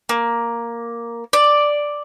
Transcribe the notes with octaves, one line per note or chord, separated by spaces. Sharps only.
A#3
D5